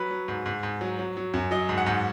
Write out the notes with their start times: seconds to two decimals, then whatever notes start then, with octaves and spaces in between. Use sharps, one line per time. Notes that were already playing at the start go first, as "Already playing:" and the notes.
Already playing: F#3 B4
0.11 F#3
0.28 G#2
0.46 G#2
0.63 G#2
0.81 F#3
0.99 F#3
1.17 F#3
1.34 F#2
1.51 F#3 D#5
1.69 G#2
1.78 F#5
1.86 G#2